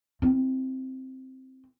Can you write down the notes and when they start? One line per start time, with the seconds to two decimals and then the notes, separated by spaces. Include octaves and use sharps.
0.22 C4 E4